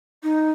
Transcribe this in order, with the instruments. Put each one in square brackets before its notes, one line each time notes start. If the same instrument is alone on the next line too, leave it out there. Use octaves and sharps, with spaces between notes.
[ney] D#4